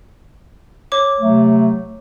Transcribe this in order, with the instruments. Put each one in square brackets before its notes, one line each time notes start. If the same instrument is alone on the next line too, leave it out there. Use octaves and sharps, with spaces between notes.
[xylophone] C#5 D6
[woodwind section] C3 F#3 A3